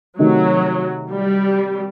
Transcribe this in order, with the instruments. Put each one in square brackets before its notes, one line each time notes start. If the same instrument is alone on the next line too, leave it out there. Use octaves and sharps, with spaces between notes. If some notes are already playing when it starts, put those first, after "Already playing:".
[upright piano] C3 D#3 A3 D#4 F#4 [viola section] F#3
[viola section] G3